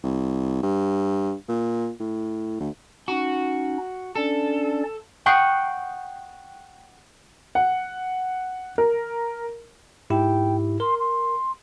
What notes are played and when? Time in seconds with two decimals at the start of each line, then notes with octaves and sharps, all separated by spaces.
0.04 C2
0.63 G2
1.49 A#2
2.00 A2
2.60 D2
3.08 C#4 D#4 F#4
4.16 C#4 D4 A4 D5
5.26 F#5 G5 C#6 D#6 C7
7.55 F#5
8.78 A#4
10.10 G#2 E4 G4 G5
10.80 A#4 C6
10.99 C6